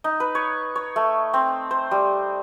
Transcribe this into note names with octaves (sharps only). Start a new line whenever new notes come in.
D#4
B4
C#5
C#5
A3
C4
C5
G3